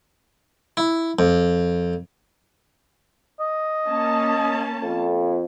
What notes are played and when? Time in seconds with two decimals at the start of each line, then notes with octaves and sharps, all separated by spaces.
0.77 E4
1.19 F2
3.40 D#5
3.87 A#3 C#4 A5
4.83 F2